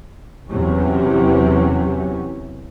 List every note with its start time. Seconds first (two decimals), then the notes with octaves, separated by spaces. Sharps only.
0.48 E2 C3 E3 F#3 C#4